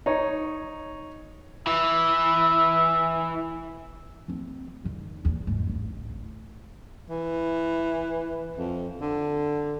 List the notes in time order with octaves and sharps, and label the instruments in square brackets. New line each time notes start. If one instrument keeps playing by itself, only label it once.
[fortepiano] D#4 C#5
[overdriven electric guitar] E3 [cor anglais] E5
[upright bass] F3 C4
E2 D#3
E2 A#2
F1 G#2
D1 A1
[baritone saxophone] E3
F2
D3